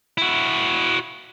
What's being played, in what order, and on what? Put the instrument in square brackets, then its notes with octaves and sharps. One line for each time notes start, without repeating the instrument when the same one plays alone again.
[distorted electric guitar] E4 F#4